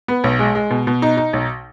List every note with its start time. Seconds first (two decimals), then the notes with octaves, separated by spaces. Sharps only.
0.08 B3
0.24 B1
0.39 G#3
0.55 G#3
0.70 B2
0.87 B2
1.02 D#4
1.17 D#4
1.33 B1